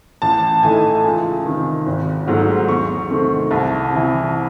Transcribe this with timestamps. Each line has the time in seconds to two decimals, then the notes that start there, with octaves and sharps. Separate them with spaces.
0.22 A1 A5
0.63 A2 E3 A3 D#4 G#5
1.04 C#2
1.45 C3 D#3
1.86 G#1
2.27 G#2 F#3 A3
2.68 E2 C#6
3.10 C3 D#3 A3 C4
3.51 C2 A5
3.92 C3 E3